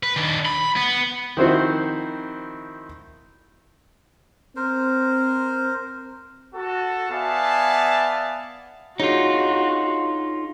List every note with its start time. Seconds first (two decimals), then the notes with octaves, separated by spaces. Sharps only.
0.03 B4
0.16 D#3 D4
0.45 B5
0.76 B3
1.37 D#3 F3 C4 E4 F#4 C5
4.56 C4 A#4 C5
6.55 F#4 A4
7.11 B3 D5 E5 F5 G#5 A5
9.00 D4 D#4 F4 F#4 G#4 C#5